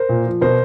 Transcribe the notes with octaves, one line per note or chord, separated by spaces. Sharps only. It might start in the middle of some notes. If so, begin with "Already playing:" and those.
Already playing: A#4 C5
A#2
F3
B2 A#4 C5